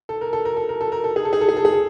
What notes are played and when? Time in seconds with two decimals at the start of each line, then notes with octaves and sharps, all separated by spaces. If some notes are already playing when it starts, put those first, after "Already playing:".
0.09 A4
0.21 A#4
0.33 A4
0.45 A#4
0.57 A4
0.69 A#4
0.81 A4
0.92 A#4
1.04 A4
1.16 G#4
1.25 A4
1.33 G#4
1.41 A4
1.49 G#4
1.57 A4
1.65 G#4
1.74 A4